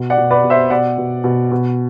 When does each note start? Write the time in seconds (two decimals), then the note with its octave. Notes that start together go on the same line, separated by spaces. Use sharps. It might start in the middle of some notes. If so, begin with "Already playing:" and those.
Already playing: B2
0.10 D5 F#5
0.18 B2
0.31 B4 D5
0.44 B2
0.50 C5 E5
0.70 B2 D5 F#5
0.98 B2
1.24 B2
1.51 B2